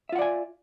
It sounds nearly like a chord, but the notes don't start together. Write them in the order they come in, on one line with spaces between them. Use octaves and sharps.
E5 F4 F#5 D5 G#5